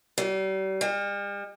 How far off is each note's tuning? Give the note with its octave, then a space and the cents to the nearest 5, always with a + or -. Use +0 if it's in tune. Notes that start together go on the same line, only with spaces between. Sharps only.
G3 -40
G3 +45